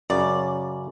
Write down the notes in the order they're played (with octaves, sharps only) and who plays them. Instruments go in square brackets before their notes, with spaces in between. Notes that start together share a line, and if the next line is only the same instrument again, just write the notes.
[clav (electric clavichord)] F#2 C#3 [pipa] D5